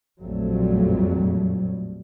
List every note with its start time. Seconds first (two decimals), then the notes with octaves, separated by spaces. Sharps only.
0.21 A#1 F2 A2 F#3 G3 A3